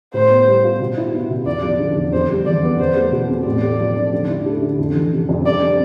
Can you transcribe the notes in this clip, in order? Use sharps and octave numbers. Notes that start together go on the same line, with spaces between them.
A2 C5
B3
G3
F4
B2
E4
B3
B2
E2 D5
F3
D3
E2
F2 C5
G3
E3 D5
B3
E2 C5
A3
B2
C4
A2 D5
A3
F3
D4
D3
E4
A3
D3
F2
E3
C3
F2
G2 D5
C4